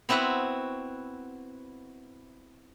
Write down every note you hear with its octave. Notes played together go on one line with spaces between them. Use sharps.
B3 C4 E4 F#4 B4